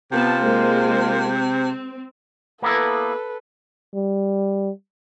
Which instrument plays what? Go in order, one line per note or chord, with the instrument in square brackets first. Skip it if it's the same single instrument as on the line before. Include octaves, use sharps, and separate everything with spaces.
[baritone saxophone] C3 [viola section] B3 A5 [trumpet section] F4
[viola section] G#3 A#3 C5
C4
[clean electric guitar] A#3 B3 E4 [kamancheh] A4 B4
[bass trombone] G3